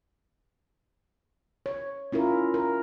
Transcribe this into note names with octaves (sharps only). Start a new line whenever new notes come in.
C#5
C#4 E4 F4 A#4
A#4